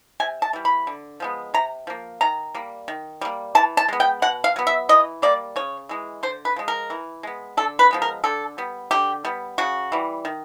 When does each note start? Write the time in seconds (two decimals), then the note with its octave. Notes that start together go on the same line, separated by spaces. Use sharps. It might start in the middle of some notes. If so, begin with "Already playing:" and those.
0.20 C3 G#5
0.42 A5
0.53 E3 G3
0.65 B5
0.87 D3
1.20 F3 G#3 B3
1.54 C3 A#5
1.87 F3 A#3
2.21 D#3 A#5
2.55 G3 A#3
2.88 D#3
3.21 G3 A#3
3.55 E3 A5
3.77 A5
3.89 G#3 B3
4.00 G5
4.22 B2 F#5
4.44 F5
4.56 F#3 B3
4.67 E5
4.89 E3 D#5
5.22 G3 A#3 D5
5.56 C#3 C#5
5.89 E3 G#3
6.23 D3 C5
6.45 B4
6.56 F3 G#3
6.68 A#4
6.90 E3
7.23 G#3 B3
7.57 D3 A4
7.79 B4
7.91 F3 G#3 B3
8.02 A#4
8.24 D3 A4
8.58 G3 B3
8.91 D3 G4
9.25 G3 B3
9.58 C#3 F#4
9.92 E3 G3
10.25 D#3